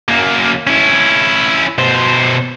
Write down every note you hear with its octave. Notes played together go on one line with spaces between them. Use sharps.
F#2 A#3
C#4 E4
B2 C5